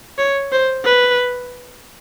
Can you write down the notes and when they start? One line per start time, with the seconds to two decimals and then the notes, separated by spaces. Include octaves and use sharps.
0.18 C#5
0.52 C5
0.85 B4